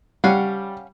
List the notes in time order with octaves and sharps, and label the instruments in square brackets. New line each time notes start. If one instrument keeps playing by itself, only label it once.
[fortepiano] G3 [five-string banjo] C#4 F5 F#5